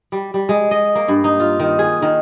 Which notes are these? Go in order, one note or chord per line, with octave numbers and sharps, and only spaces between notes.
G3
G3
G#3
D#5
A#3
G2
D#4
F4
D#3
G#4
D#3